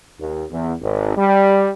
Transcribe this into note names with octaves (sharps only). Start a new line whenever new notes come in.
D#2
E2
G#1
G3